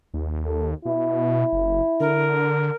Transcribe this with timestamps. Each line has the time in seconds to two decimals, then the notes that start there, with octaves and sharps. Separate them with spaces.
0.14 D#2
0.46 A4
0.85 B2 E4
1.53 F#1
2.00 D3 A#4